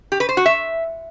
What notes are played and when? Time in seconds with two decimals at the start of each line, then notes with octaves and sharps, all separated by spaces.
0.12 G4
0.20 B4
0.29 C5
0.37 F#4
0.46 E5